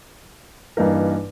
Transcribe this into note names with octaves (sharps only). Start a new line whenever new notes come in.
G2 E3 A#3 D#4 A#4